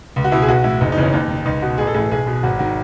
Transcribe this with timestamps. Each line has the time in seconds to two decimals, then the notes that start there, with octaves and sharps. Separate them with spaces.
0.16 C#2
0.24 F#4
0.32 B2 E4
0.42 G#4
0.48 B1 F#4
0.64 A2 E3 E4
0.81 F#1 D#4
0.92 D#4
0.97 E2 C#3 E3
1.03 C#4
1.13 D#2 D#4
1.29 D#3
1.45 C#2 D#4
1.62 B2 F#4
1.78 A1 G#4
1.87 A4
1.94 A2 E3 G#4
2.11 B1 G#4
2.27 B2
2.43 G#1 F#4
2.59 D#3 F#4